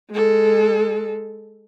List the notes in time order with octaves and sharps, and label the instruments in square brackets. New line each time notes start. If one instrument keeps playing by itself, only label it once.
[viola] G#3 A4